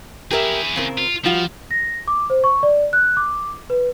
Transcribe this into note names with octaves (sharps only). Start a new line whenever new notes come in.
E4 G4 G#4 A#4 E5
C#3 C4 A#4
F4
F3 G3 F4 F#4
A#6
D6
C5
C#6
D5
F#6
D6
B4